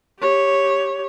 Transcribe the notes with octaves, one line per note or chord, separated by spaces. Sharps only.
G4 C#5